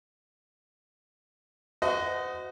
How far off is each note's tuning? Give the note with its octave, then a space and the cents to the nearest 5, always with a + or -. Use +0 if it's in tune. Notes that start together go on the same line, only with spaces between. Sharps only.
F#4 +0 C5 -40 D#5 +0